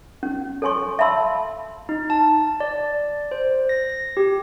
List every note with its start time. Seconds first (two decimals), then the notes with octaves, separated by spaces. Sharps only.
0.23 C#4
0.62 A4 C#5 G#5 C6 C#6
0.99 E5 F5 A5 B5 C6 E6
1.89 D#4
2.10 A5
2.60 D5
3.31 C5
3.69 A#6
3.90 A#6
4.17 G4